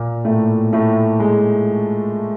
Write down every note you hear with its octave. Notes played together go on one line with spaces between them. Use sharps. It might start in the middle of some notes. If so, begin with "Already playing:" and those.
Already playing: A#2 A#3
A2 A3
A2 A3
G#3